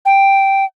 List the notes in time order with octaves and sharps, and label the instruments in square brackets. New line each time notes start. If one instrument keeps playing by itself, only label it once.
[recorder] G5